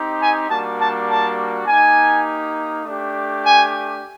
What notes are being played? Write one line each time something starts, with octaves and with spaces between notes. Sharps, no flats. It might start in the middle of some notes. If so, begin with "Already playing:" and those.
Already playing: C4 D#4 G4
G#5
G3 A#3 D4 F#4 A5
A5
A5
A#3 D#4 G4 G#5
A3 D4 G4
G#5